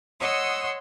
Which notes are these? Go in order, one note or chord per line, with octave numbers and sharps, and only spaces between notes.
C#5 D#5 F#5 C6 D#6 E6